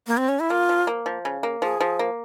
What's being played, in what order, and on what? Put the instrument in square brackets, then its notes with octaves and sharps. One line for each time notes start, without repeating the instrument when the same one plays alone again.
[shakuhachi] A#3
C4
C#4
E4
[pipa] A#3 [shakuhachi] F4
[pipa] F3
A#3
F3
C#3
A#3
[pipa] F3 [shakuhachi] G#4
[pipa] F3
A#3